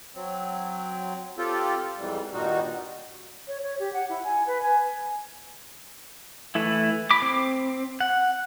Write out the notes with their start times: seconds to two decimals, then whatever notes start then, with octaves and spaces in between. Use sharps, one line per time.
0.15 F#3 C4
1.38 C4 F4 G4 A4
1.98 F2 G#2 E3 G3
2.33 G2 A#2 D#3 G3 D#4 F#4
3.47 C#5
3.62 C#5
3.79 G4
3.92 F#5
4.09 E4
4.23 G#5
4.46 B4
4.62 G#5
6.55 E3 A3 E4
7.11 B5 D6
7.22 C4
8.01 F#5